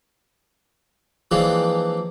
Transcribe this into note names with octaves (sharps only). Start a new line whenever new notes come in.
E3 F3 G#3 A#3 C4 D4